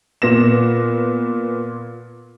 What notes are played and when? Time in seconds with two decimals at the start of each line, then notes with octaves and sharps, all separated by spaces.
0.22 A#2 B3 A#6 E7